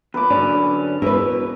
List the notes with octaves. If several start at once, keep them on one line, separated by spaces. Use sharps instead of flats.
E2 A#2 B4 D6
D3 F#3 C#4 D5 A5
B2 E3 A#4 B4 E5